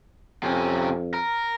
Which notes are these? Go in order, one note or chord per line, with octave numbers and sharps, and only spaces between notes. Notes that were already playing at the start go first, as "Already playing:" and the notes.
F2 C3 C#4
A#4